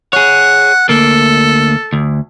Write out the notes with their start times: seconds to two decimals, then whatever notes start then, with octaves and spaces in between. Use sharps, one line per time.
0.13 G#4 C#5 F#5
0.89 D2 A#3 A4
1.93 D2